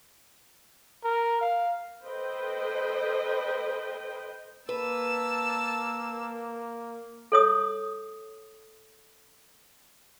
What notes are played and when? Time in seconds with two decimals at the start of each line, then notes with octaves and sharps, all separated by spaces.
1.04 A#4
1.41 F5
2.06 A4 B4 C5 D#5 G5
4.69 A#3 B4 A5 E6
7.32 A4 C#5 D#6